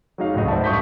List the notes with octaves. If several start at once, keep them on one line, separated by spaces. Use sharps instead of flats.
F#3 G#3 D#4 C#5 F5
C#2 F#2 A2 F#4 D#5
C5 D5 E5 A5
D2 G2 C#6 D#6 G6 B6